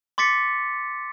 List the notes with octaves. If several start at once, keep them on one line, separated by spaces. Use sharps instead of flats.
C6 D6 A6 B6 C#7